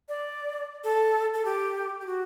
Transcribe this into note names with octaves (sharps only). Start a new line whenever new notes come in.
D5
A4
A4
G4
G4
F#4